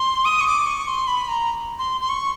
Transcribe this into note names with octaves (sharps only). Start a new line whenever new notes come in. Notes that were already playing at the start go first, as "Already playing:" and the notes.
Already playing: C6
D#6
C#6
D6
C#6
C6
B5
A#5
C6
C6
C#6